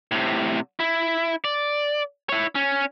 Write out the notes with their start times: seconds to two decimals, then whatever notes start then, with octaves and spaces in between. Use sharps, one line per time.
0.11 A2 C3
0.80 E4
1.45 D5
2.29 E4 C#5
2.55 C#4